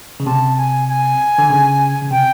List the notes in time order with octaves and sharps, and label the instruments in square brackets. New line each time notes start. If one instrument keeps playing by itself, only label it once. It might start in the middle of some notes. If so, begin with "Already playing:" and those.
[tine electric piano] C#3
[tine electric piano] C3 [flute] A5
[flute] G#5
G#5
[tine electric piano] D3
C#3
C#3
[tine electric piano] C3 [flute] G5